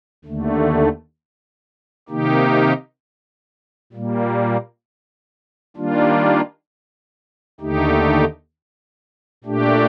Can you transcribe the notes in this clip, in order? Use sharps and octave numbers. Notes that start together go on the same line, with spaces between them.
D#2 D3 A3
C3 D#3 A#3 D#4 G4
A#2 G3 A#3
D#3 G3 A#3 D4 F4
D#2 D3 A3 D#4 G4
A#2 A3 D4 G4